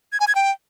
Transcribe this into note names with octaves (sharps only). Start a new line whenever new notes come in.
G#6
G#5
G#6
G5